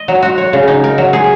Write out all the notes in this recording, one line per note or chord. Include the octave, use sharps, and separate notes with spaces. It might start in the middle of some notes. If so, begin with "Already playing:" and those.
Already playing: D#5
F#3
F#4
C#5
C#3
D#4
A#4
F#3
G#4